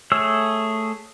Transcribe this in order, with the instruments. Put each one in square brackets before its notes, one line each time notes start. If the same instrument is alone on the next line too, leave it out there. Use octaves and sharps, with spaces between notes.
[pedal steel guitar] A3 G#4 C#5 E6